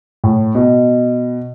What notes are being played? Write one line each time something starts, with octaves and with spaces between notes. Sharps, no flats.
A2
B2